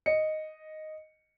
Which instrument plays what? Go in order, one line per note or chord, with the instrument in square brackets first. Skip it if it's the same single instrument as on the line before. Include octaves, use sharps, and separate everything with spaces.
[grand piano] D#5 C#7